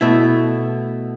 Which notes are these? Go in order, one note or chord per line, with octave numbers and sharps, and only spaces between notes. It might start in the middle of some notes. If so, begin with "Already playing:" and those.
B2 A3 E4 A4